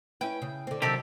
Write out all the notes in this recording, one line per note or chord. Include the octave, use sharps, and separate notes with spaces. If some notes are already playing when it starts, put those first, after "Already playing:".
C#4 E4 B4 G5
C#3
D3 C4
C3 D#3 F#3 C4 D4 G4 A4